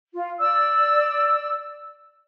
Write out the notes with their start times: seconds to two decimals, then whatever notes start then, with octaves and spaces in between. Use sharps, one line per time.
0.12 F4
0.39 D5 E6